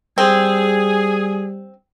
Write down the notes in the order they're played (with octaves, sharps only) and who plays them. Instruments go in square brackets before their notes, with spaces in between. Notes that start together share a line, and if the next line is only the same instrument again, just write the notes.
[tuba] G3 [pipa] C4 [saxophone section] G#4